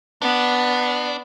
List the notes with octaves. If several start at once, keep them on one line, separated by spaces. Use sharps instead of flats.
B3 D4